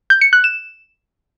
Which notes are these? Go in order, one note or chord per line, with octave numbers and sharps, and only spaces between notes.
G6
C#7
F#6
E7